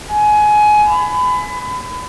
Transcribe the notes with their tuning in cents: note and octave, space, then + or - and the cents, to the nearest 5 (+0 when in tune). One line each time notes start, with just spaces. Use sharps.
G#5 +20
B5 +30